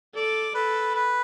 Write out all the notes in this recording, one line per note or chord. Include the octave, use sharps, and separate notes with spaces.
A4 D5
A4 B4
B4